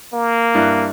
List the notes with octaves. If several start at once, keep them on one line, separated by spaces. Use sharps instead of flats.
A#3
G2 E4 F#6